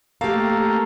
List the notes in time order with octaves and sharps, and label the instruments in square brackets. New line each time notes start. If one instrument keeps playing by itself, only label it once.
[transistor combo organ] A3 A#3 [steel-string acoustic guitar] G4 F5